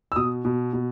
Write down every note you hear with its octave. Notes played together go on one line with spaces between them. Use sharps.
E6
B2 D#6
B2
B2